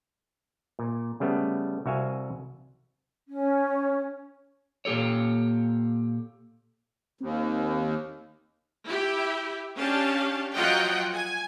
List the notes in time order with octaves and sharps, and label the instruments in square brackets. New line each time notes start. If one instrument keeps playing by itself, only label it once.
[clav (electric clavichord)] A#2
C#3 G3 A3 B3
C2 F#4 E5 F5 G#5
[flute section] C#4
[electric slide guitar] A#2 A#3 G4 A4 C#5
[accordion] D#2 [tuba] C4
[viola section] E4 G4 E5
C#4 D4 G4 F5 A5
F3 F#3 F4 D#5 F#5 G5
G#5